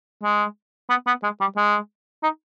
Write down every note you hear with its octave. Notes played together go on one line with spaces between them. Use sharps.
G#3
B3
B3
G#3
G3
G#3
D#4